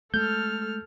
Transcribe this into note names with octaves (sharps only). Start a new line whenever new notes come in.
G#3 A3 A4 F6 G6